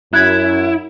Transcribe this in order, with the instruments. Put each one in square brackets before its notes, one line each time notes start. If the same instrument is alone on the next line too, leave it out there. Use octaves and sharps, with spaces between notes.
[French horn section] F#2 [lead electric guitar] E4 [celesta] F#6 G#6